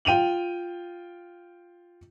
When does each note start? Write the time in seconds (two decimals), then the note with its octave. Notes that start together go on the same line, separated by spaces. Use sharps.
0.05 F4 G5 D#7 F7 F#7